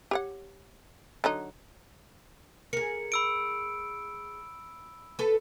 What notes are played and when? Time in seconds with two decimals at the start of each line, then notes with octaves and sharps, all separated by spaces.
0.11 G4 C#5 F#5
1.24 D3 F#3 D#4
2.73 G#4 A#4 C#7
3.12 B5 E6 D7
5.19 A4 B4